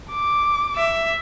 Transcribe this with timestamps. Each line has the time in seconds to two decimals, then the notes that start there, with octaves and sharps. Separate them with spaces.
0.11 D6
0.76 E5